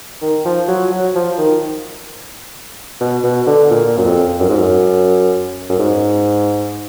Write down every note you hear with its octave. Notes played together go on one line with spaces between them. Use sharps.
D#3
F3
F#3
F#3
F3
D#3
B2
B2
D3
A#2
F#2
F2
F#2
G#2
F#2
F#2
G#2